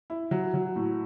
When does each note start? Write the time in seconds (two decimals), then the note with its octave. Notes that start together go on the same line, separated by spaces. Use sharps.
0.10 E4
0.31 F#3
0.54 F#3
0.76 A2